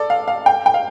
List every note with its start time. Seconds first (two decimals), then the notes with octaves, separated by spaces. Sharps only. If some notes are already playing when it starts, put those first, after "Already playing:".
Already playing: A4 D5
0.10 F5
0.28 F5
0.46 G5
0.66 G5
0.74 F5